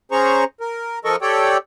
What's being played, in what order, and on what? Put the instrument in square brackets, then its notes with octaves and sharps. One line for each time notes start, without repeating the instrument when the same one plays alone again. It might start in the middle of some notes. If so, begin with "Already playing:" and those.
[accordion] C#4 G#4 C5 A#5 C#6
A#4
F3 A4 A#4 D#5 C#6
G4 A4 C#5 D5 G5